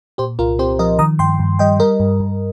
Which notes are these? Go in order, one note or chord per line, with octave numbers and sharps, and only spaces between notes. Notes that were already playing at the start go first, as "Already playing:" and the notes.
A#2 G4 C5
C2 F4 A#4
C4 G4 C5
F3 A#4 D#5
D#3 A#5 D#6
G2 G5 C6
G2
G3 D#5 G5
G3 A#4 D#5
G2
G2